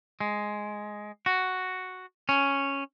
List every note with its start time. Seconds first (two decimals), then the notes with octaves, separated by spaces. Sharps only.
0.21 G#3
1.26 F#4
2.29 C#4